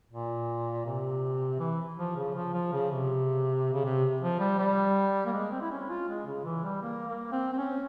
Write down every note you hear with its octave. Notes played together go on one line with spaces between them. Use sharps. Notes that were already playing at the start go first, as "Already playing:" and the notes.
A#2
C3
E3
F3
C#3
F3
F3
C#3
C3
C#3
C3
F3
G3
G3
A#3
G#3
C4
E4
C#4
F4
G#3
C#3
E3
G3
A#3
A#3
C4
C4
C#4